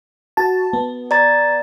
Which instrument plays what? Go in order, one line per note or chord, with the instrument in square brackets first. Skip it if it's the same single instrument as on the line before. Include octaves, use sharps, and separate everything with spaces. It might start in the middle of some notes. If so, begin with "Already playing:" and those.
[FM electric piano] F#4 A5
B3
[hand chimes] D5 A#5 A6